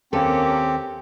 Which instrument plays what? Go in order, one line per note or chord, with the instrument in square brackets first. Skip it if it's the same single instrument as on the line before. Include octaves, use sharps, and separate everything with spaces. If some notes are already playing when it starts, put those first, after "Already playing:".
[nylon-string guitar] D#2 A4 [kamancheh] A#3 C#4 [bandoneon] C4 [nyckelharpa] G4